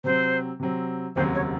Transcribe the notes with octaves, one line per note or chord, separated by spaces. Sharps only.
C3 F#3 C4 C5
C3 F#3 C4
F1 D#2 C#3 F#3 C4 C5
C#5